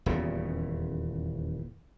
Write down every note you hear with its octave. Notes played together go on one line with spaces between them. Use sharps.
D#1 E2 C#3